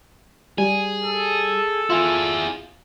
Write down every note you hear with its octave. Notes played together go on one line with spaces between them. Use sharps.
G3 G#4
A4
E4 F4 G#4